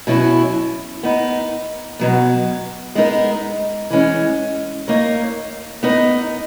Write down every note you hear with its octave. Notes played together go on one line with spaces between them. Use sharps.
B2 F#3 C#4 E4
B3 D#4 A#4
B2 F#3 B3
G#3 B3 D#4 A#4
E3 G#3 C#4
A#3 D#4 A#4 C#5
B3 D#4 A#4 D#5